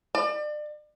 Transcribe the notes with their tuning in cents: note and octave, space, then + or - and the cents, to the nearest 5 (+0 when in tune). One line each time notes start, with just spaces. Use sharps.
D5 +35